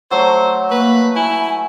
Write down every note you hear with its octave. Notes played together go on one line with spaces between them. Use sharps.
F#3 A3 C5
A#3 B4
E4 G#5